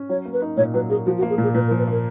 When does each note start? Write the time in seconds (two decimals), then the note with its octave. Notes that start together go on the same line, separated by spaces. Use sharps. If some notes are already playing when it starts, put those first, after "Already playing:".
Already playing: C#4
0.09 F#3 C#5
0.25 A#3
0.33 B4
0.42 D#4
0.57 A#2 C#5
0.74 F#3 B4
0.90 A#3 G#4
1.06 F3 F#4
1.18 F#4
1.22 A#3
1.30 G#4
1.38 A#2
1.43 G#4
1.54 A#2 B4
1.67 A#4
1.71 F3
1.79 B4
1.88 A#3 A#4